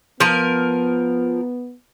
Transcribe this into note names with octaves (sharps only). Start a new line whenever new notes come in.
F3 B3 A#4